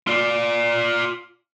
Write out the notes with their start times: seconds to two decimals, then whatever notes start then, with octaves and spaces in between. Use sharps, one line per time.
0.07 F4 D5